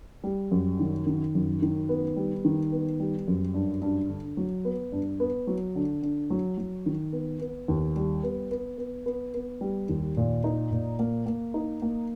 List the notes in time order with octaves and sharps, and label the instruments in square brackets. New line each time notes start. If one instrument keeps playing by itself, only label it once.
[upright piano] G3
F#2
D#3
D#3
F#2
D#3
B3
G3
D#3
B3
G3
F#2
G2
G2
D3
F#3
B3
G2
B3
F#3
D3
D3
F#3
F#3
D#3
B3
B3
D#2
G3
B3
B3
B3
B3
B3
G3
D#2
A#2
D#4
A#2
A#3
A#3
D#4
A#3